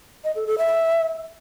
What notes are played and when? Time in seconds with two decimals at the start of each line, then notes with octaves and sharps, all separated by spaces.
0.24 D#5
0.36 A4
0.47 A4
0.58 E5